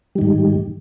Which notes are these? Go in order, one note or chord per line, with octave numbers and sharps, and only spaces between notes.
G#2 D#3 G3